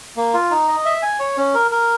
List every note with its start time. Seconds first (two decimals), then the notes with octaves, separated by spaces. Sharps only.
0.17 A#3
0.34 F4
0.51 D#4
0.68 D#5
0.85 E5
1.03 G#5
1.20 C#5
1.37 C#4
1.54 A#4
1.71 A#4